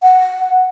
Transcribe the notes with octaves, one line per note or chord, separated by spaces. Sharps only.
F#5